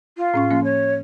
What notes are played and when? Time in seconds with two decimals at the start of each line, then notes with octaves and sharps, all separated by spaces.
0.17 F4
0.34 A2 C#4 C#6
0.51 F3 A#3 C#4
0.63 C#5